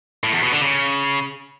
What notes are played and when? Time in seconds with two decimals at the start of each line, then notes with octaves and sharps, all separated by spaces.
0.24 A2
0.33 E2
0.42 B2
0.52 D3
0.61 C#3